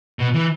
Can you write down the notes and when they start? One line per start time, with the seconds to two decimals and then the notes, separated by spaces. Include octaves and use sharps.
0.19 B2
0.34 E3